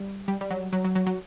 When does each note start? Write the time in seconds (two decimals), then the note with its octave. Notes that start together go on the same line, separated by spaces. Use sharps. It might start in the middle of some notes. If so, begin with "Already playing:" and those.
Already playing: G3
0.28 G3
0.41 G3
0.50 F#3
0.73 F#3
0.84 F#3
0.95 F#3
1.06 F#3